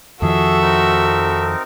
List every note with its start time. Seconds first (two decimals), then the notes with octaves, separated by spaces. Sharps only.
0.22 F2 D#3 F3 F#4 G#4 A4 E5
0.62 C4 D#4 A#4